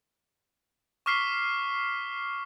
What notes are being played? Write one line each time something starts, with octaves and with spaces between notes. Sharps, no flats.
C#6 D6 F6 B6 C7 G7